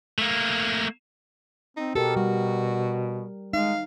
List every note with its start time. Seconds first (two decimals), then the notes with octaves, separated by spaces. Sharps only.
0.19 A3 A#3
1.77 C4 D#4
1.95 B2 G4 A4 A#4
2.16 G3 F#4
3.53 G#3 D#4 F5